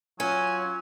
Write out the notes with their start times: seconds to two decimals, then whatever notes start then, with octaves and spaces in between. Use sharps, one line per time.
0.20 F#3 C#4 F4 G#5